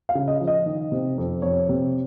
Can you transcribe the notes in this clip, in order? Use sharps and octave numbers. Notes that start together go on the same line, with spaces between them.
F5
C#3
D#5
F3
D#5
D#3
C3
F2
F2 C#5
C3